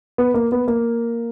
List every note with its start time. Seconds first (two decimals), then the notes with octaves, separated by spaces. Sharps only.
0.18 B3
0.34 A#3
0.52 B3
0.68 A#3